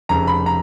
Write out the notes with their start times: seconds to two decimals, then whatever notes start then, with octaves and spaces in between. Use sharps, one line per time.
0.09 F1 F2 C#3 A#5
0.27 B5
0.46 A#5